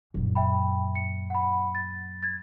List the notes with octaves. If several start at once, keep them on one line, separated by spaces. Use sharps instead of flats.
F#2 A#2
E5 G5 B5
C#7
F#5 B5
A6
G#6 A6